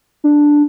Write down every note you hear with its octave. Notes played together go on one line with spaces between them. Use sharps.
D4